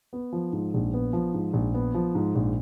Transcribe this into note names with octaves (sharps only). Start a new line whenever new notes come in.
B3
F3
G#2
A#1
B3
F3
G#2
A#1
B3
F3
G#2
A#1